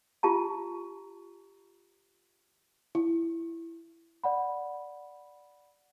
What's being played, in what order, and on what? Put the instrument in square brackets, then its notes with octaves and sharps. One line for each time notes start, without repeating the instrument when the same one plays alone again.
[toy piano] F4 G4 A5 A#5
[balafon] E4
[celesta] D5 F#5 B5